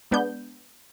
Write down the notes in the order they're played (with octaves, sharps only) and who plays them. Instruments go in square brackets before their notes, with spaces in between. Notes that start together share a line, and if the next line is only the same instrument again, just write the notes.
[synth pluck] G#3 B3 D4 G6